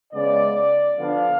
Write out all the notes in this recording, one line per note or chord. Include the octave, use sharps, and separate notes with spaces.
C#3 G#3 B3 D5
D3 F3 B3 D4 F5